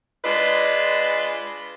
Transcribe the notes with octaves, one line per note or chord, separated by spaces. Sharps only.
G#3 D4 F4 B4 D#5